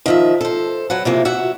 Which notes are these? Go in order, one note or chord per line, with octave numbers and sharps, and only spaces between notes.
D#3 F3 E5
A4 C5
F#3 B4 F#5
F2 C3 E3 A#3
F#4 E5 F#5